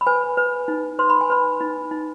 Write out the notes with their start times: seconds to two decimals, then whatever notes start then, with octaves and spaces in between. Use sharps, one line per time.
0.01 B5
0.06 B4 G#5
0.37 B4
0.68 D#4
0.99 B4 C6
1.10 B5
1.21 G#5
1.30 B4 B5
1.60 D#4
1.91 D#4